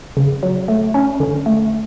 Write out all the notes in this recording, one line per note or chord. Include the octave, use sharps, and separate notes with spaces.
C#3
F#3
A3
C#4
D3
A3